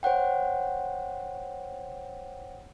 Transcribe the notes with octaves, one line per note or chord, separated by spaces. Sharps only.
C5 C#5 F#5 G5